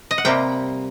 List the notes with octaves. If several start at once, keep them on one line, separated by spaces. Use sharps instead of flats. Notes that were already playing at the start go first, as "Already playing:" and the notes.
D#5
F#5
C3 G3 A#3 G5